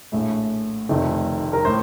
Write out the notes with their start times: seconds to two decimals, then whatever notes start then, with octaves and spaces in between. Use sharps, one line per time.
0.12 A#1 A2 A3
0.89 F1 F2 D#3 A3
1.53 A#4
1.65 A2 C5